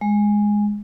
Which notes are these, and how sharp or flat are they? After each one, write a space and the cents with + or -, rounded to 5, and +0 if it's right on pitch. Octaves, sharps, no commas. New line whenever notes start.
G#3 -5